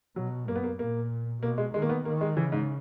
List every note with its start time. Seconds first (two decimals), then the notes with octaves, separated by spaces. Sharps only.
0.16 B2 F#3
0.47 F#2 A#3
0.55 B3
0.63 A#3
0.79 A#2 A#3
1.42 B2 A#3
1.58 G#3
1.74 D#3 G#3
1.82 A#3
1.89 B3
2.05 D#3 A#3
2.21 G#3
2.36 C#3 E3
2.52 G#2